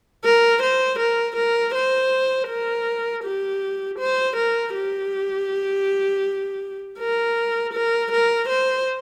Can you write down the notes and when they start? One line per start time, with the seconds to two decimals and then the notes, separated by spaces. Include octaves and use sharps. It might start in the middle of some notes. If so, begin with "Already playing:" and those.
0.25 A#4
0.62 C5
0.99 A#4
1.36 A#4
1.74 C5
2.48 A#4
3.24 G4
3.99 C5
4.36 A#4
4.74 G4
6.99 A#4
7.73 A#4
8.12 A#4
8.49 C5